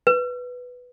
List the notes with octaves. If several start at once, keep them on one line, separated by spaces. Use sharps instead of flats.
B4